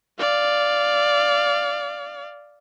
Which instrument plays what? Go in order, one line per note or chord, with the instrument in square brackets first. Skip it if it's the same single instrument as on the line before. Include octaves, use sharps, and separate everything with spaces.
[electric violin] D5 F5